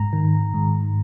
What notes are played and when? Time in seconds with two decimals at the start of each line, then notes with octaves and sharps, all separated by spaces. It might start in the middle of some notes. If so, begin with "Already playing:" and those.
Already playing: G#2 A#5
0.13 D#3
0.54 G#2